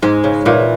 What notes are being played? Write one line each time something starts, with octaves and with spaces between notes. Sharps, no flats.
G#2 G#3
C#3
A#2 E3